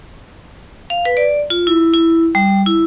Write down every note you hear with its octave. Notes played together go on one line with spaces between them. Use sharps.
F5
B4
D5
F4
E4
E4
G3
E4